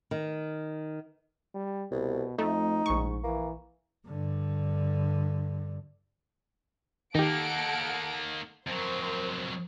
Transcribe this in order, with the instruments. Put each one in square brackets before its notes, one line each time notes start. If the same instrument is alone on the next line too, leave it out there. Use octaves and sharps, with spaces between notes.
[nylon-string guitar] D#3
[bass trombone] G3
[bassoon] C2 [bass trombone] B2
[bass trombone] F2 [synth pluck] A3 [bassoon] D#4
[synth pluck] A#1 C#6 [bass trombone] G#2
[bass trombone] E3 [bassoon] A#3
[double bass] G2 D3
[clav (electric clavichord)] D#3 G4 [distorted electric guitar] A#3 D#4 [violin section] A4 F#5 D7
[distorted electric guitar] F2 F#3 [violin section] A#4 C5